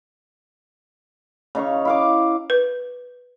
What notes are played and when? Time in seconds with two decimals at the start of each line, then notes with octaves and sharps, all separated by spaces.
1.55 C#3 D#4 F5 C#6
1.85 E4 F5 D6
2.50 B4